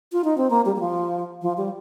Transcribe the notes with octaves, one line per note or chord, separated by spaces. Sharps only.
F4
D#4
C4
A#3
G3
G3
F3
F3
G3